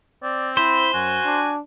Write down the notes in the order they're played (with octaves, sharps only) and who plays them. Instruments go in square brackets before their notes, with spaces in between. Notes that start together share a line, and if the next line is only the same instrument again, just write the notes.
[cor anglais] C4 [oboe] D5
[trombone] E4 [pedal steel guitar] C5 [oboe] B5
[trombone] F#2 [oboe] F#4 [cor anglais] G#5
[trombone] D4